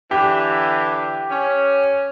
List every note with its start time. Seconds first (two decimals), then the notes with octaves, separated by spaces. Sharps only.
0.11 D3 E3 G4
1.31 C#4